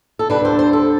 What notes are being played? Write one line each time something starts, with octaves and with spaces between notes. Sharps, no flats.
A4
D2 D3 G3 D4 B4
C5
C5
A4